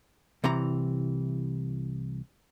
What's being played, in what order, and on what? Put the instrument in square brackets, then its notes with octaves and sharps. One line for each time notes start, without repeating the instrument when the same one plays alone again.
[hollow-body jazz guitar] C2 C3 E3 A#5